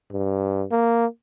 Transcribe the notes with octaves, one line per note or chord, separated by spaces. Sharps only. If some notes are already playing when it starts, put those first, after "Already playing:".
G2
A#3